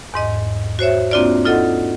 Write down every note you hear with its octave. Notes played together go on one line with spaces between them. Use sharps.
E2 G#2 D#5
F#4 C5 C#5 E5
A#3 C4 D4 F4 F#4 D5
D#4 F4 A4 D#5 F#5